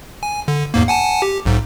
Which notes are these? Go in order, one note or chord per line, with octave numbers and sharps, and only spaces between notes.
G#5
D3
E2 G#2 A#3
F#5 G#5 A5
G4
B1 G#2